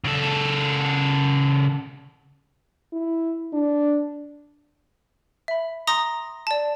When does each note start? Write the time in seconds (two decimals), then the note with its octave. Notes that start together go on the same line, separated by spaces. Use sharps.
0.04 C#3 A4
2.93 E4
3.53 D4
5.48 E5 B5
5.87 A#5 C6 D#6 A#6
6.47 D5 A5